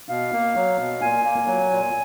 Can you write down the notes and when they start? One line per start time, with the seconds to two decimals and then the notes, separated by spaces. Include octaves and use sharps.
0.09 B2 F5
0.32 A#3
0.55 F#3
0.79 B2
1.01 A#2 G#5
1.24 A#3
1.47 F#3
1.71 A#2